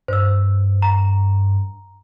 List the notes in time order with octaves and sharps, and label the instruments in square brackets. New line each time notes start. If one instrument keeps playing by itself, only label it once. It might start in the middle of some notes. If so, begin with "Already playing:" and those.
[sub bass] G2 [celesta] C5 E6
[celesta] A#5